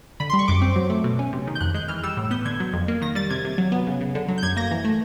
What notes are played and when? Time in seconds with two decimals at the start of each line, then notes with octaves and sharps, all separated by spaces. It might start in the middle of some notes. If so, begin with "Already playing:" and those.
0.20 D3 B5
0.30 C6
0.33 G3
0.39 C#6
0.48 F#2 D6
0.61 C4
0.76 F#3
0.90 A3
1.04 B2
1.19 C#4
1.33 C3
1.47 D#3
1.55 G6
1.61 F2 F#6
1.74 G#3 G6
1.88 E3 F6
2.03 G3 E6
2.17 A2
2.31 B3 G6
2.45 D3 G#6
2.60 F#3
2.73 F2
2.88 A#3
3.02 D#3 A#6
3.15 G3 A6
3.30 C3 G#6
3.45 C3
3.58 F#3
3.72 B3
3.87 C#3
4.01 C#3
4.15 D3
4.28 F#3
4.38 G6
4.43 F#2 G#6
4.56 A#3 A#6
4.71 E3
4.85 A3